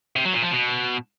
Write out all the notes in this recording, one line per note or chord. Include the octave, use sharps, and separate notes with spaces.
C3
F#3
A#2
F3
B2